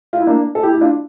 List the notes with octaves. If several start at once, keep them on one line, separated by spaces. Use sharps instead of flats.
F4
E4
A#3 D4
A4
E4 G4
E4
D4 F4